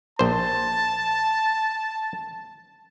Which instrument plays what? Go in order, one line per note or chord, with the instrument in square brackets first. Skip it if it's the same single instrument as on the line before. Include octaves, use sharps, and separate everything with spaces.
[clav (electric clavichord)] A#1 C5 [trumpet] A5